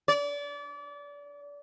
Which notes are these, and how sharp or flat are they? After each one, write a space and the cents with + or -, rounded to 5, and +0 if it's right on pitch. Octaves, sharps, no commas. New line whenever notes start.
D5 -30